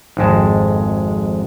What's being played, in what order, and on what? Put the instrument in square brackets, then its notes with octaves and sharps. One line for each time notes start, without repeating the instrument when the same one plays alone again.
[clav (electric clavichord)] G#1 F2 G#3 A5